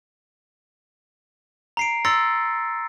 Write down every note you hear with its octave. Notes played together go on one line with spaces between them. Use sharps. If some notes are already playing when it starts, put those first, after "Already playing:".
A#5 C7 D7
A#5 C6 E6 A6 A#6 C#7